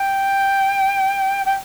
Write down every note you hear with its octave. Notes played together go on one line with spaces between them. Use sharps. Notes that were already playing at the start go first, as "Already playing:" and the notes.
Already playing: G5
G5